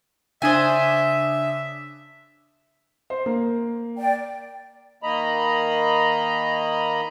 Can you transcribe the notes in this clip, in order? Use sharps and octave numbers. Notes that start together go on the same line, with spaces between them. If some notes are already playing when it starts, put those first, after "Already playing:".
C#3 D4 C5 E5 G#5 D#6
C5
A#3
D5 G5
D#3 A#3 D#5 A#5 B5